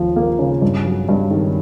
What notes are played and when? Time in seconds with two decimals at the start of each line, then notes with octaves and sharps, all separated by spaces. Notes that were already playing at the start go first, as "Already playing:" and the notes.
Already playing: D#2 F3
0.16 A#3
0.39 C#3
0.62 G2
0.85 F#3
1.09 G2
1.30 D#3